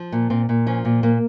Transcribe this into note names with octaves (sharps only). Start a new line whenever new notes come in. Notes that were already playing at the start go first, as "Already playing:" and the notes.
Already playing: F3
A#2
A#2 C4
A#2
F3 C#4
A#2
A#2 A#3